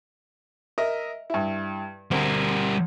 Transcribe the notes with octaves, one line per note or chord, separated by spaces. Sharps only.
A#4 D#5 E5
G2 E4
D2 G3 C4 A#4